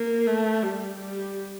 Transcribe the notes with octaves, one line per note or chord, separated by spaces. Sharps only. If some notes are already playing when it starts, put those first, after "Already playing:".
Already playing: A#3
A3
G3
G3